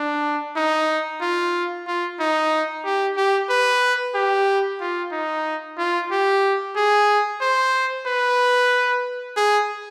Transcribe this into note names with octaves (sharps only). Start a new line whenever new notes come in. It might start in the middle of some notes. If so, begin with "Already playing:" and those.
Already playing: D4
D#4
F4
F4
D#4
G4
G4
B4
G4
F4
D#4
F4
G4
G#4
C5
B4
G#4